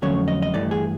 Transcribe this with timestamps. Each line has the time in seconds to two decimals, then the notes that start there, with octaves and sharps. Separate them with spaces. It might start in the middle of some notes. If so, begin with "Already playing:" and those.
0.02 F2 D3 F#3 A3 C#4 C#5
0.28 D#5
0.42 D#5
0.54 G2 E3 A3 D5
0.71 G#4